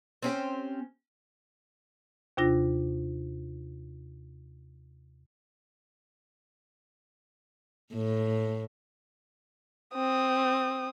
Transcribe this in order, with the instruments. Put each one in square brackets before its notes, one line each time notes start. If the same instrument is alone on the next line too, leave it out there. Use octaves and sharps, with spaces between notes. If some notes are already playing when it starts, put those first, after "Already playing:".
[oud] C4 C#4 G4
[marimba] D#2 C3 D4 F4 A#6
[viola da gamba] A2
[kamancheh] C4 D#6